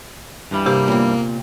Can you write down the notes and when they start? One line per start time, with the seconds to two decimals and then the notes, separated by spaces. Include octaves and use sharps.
0.51 G2 E3 G3
0.66 C3 A#3 G4
0.88 A#2 B3 C4